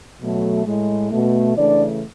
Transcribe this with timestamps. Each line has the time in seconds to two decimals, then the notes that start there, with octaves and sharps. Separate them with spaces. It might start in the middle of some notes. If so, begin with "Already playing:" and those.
0.21 B2 F#3 A3
0.66 A2 G#3
1.11 B2 A3
1.56 C#3 E3 A3 D4 D5